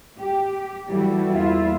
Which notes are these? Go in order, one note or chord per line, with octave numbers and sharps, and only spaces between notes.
G4
E3 G3 E4 F#4 A4
E2 A#3 E4 F4 E5